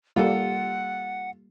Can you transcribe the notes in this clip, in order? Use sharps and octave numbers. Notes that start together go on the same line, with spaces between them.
G3 A#3 F4 A4 F#5